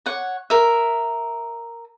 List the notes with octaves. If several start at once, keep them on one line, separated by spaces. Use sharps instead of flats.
C#5 F#5
A#4 E5